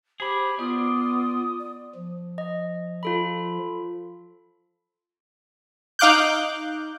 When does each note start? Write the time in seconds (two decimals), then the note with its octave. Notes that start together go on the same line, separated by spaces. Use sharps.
0.20 G4 G#4 C5 B5
0.59 B3 F4 D5 D#6
1.59 D5
1.95 F3
2.38 D#5
3.03 F4 A4 B5
5.99 D#4 F5 D6 F#6 G6